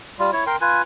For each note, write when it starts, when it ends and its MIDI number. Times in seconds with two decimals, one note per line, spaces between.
0.19 0.31 55
0.19 0.31 65
0.33 0.44 64
0.33 0.44 73
0.47 0.56 70
0.47 0.56 79
0.47 0.56 84
0.61 0.82 65
0.61 0.82 71
0.61 0.82 80